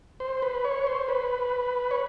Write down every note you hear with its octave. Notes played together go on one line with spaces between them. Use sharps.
C5
B4
C#5
C5
B4
C#5